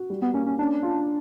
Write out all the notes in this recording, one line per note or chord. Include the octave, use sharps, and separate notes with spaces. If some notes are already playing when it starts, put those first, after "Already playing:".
Already playing: F#4
G3
B3
A#3 C#4
C#4
C#4 D4
F4